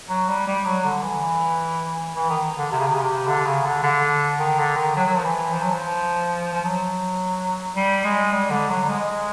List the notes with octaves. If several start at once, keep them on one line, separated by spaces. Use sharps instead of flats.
F#3
G3
G3
F#3
D3
E3
E3
D#3
D3
C3
C#3
C3
C#3
C3
D3
C#3
D3
D3
D#3
D3
D#3
F#3
F#3
F3
E3
F3
F#3
F3
F3
F#3
G3
G#3
G3
D3
F#3
G3
G#3